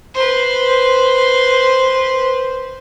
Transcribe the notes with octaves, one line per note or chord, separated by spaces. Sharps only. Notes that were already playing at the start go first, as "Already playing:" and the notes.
B4 C5